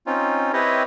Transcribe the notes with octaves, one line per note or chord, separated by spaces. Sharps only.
C4 C#4 D#4 F4
C4 E4 G4 B4 C#5 D#5